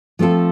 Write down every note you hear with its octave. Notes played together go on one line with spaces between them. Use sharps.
F3 A3 C4 F4 A4